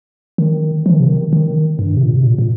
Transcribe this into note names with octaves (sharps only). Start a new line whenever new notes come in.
D#3
F3
D#3
C3
D#3
D#3
G2
C3
A#2
C3
A#2
A#2